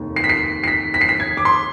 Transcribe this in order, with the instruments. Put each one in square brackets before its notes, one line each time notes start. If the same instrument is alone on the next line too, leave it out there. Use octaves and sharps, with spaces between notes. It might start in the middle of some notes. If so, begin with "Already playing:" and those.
Already playing: [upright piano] F1 D#2 D#3
C7
B6
C7
C7
B6
B6
C7
B6
G#6
D6
C6